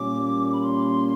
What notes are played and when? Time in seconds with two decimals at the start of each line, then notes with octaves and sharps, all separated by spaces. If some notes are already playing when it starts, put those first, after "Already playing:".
Already playing: A#2 G3 A#3 C#4 D6
0.53 B5
0.62 C6